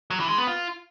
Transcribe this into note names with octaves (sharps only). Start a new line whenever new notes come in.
F#3
E3
G#3
B3
F4